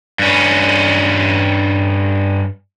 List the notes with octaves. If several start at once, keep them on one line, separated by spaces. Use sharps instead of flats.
G2 C#4